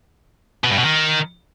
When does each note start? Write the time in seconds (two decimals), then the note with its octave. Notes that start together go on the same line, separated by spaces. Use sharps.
0.64 B2
0.70 G2
0.77 B2
0.84 D#3